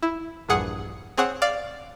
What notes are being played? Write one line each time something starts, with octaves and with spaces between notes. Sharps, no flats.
E4
A#1 E2 G2 G#4 F#5 C#7
C4 G#4 C#5 F#5
D5 F5